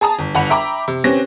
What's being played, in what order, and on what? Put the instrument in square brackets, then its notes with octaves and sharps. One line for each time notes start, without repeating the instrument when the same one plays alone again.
[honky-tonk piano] G#4 A5 A#5 D#6
G1
G1 F#5 B5 F7
E5 G5 A#5 B5 D6
C3
C4 C#4 G4 B4 A#6